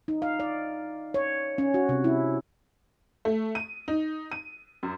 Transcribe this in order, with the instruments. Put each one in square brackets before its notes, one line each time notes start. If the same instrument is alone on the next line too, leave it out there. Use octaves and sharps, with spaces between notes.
[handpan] D#4
F5
D5
C#5
C#4
F#4
C3
E4
[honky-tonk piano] A3
D#7
D#4
D#7
F#2